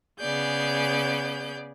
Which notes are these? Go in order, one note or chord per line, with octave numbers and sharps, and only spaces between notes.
C#3 B3 G#4 D5 G6